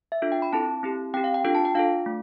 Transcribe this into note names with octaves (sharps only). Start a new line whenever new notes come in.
E5
D4 F4 A4
G5
B5
C4 E4 A4 A5
C4 E4 G4
C4 G4 G5
F5
G5
D4 F4 A4 G5
A5
G5
D4 F4 A4 F5
A3